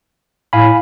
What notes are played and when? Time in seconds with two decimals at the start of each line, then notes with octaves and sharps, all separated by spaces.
0.53 A2 F5 G#5 B5